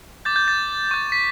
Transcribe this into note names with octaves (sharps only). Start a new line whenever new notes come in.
D6 G6 A6
G6
A6
C#6 G6
B6